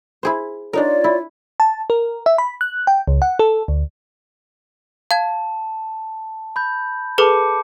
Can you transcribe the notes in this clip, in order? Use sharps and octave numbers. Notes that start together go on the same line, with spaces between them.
E4 G#4 C5
D4 D#4 F4 A#4 C#5 D5
E4
A5
A#4
E5
B5
F#6
G5
C#2
F#5
A4
D2
F5 A5 G#6
B5 G6
G#4 A4 B4 A5 D6 C#7